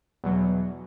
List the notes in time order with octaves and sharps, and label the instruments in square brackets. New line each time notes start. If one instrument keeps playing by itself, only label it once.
[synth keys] E2 B2 F#3